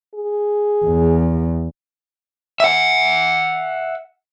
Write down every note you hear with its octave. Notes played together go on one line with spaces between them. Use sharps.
G#4
E2
E5 F#5